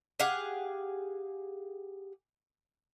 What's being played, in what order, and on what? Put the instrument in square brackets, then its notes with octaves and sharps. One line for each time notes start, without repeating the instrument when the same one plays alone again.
[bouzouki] G4 G#4 F5 F#5